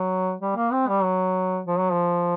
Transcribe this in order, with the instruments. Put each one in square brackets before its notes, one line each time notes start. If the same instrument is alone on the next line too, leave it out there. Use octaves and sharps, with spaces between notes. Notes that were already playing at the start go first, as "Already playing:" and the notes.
Already playing: [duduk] F#3
G3
A#3
C4
G3
F#3
F3
F#3
F3